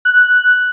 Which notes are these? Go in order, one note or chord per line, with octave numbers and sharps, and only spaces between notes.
F#6